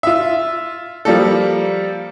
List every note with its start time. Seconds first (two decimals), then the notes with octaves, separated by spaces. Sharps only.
0.03 F4 E5
1.05 F3 G3 A#3 A4